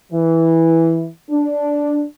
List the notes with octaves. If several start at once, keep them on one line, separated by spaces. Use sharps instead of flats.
E3
D4